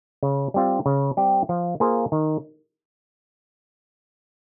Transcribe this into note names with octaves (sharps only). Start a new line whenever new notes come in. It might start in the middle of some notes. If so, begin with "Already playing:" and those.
C#3
G3 C4 F4
C#3
G3 C4 G4 C5
F3
A#3 F4 G#4 C5
D#3